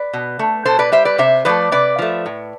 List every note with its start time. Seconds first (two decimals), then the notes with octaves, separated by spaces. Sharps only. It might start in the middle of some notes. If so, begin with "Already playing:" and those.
Already playing: B4 D5
0.13 B2
0.39 A3
0.65 B2 A4 C5
0.79 B4 D5
0.92 G3 C5 E5
1.05 B4 D5
1.18 C3 C5 E5
1.45 F3 A3 B4 D5
1.72 C3 B4 D5
1.99 F3 A3
2.26 A2